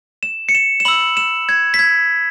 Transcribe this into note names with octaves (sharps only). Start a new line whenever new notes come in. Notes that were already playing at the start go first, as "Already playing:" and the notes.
E7
C#7
E7
E7
B5 E6 F#7
E7
G#6
B6
G#6